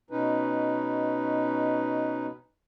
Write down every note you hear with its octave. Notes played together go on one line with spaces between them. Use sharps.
B2 C#4 D#4 B4